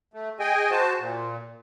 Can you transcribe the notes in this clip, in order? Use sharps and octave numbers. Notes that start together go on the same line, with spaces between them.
A3
G#4 D#5 G5 G#5
F#4 C5 A5
A#2